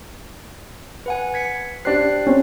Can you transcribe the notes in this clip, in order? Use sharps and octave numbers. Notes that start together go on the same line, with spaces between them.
B4 F#5 G#5
G#6 B6 C#7
D4 G4 C5 F#6 C7
C4 C#4